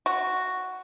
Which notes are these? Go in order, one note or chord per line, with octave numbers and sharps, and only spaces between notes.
F#4